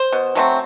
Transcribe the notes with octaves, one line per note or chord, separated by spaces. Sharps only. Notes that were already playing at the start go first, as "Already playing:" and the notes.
Already playing: C5
B2
F#3 A3 C4